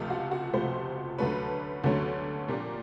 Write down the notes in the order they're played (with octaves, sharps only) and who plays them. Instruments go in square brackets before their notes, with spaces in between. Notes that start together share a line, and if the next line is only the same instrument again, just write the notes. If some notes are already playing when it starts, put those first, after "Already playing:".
Already playing: [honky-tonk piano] C#2 C3 F3 A3 F4
F#4
F#4
C#2 C3 F3 A3 C5
D2 D3 F#3 A3 C#4 B4
D2 D3 F#3 A3 C#4
A#2 F3 A#3 D4 G4